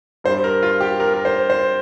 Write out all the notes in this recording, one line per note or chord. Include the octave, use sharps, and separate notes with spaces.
G2 G3 C5
A#4
F4
G4
A#4
A#4
C5
C5